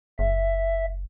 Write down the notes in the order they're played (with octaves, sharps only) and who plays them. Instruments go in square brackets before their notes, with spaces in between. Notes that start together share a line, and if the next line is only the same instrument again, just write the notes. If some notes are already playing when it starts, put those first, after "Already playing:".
[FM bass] F#1 [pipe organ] E5